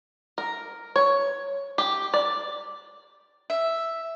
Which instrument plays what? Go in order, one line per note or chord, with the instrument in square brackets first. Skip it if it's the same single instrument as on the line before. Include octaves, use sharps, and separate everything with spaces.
[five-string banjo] A#4
C#5
G4
D5
[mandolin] E5